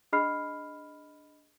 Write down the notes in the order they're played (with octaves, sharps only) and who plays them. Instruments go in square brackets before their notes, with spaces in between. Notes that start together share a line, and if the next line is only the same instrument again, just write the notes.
[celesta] D4 G#4 D#5 B5 F6 C7